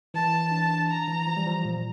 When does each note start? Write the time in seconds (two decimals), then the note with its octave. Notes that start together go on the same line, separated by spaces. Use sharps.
0.14 E3 A5
0.51 D4
0.90 A#5
1.08 E3
1.27 F3
1.37 G3
1.47 F3
1.65 A#2